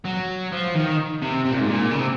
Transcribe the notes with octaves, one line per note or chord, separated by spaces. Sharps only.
F#3
F3
D#3
C3
C3
A#2
G#2
A#2
C#3
C3